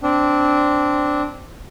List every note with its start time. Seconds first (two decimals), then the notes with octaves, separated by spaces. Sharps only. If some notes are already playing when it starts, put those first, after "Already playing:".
0.03 C4 D4